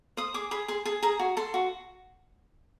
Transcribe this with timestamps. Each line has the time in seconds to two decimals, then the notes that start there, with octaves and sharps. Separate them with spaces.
0.17 C5 D#6
0.34 G#4 D6
0.51 G#4 B5
0.68 G#4 C6
0.85 G#4 A5
1.03 G#4 A#5
1.19 F#4
1.37 A4 C6
1.54 F#4